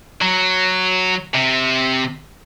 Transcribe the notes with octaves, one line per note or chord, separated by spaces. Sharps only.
F#3
C3